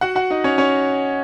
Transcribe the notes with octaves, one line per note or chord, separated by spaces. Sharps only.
F#4 F#5
F#4 F#5
D#4 D#5
C#4 C#5
C#4 C#5